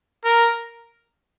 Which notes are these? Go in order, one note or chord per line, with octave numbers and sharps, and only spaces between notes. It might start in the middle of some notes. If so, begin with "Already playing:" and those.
A#4